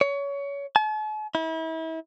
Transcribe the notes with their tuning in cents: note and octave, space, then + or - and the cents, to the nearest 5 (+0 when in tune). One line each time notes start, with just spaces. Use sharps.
C#5 +25
A5 -45
E4 -35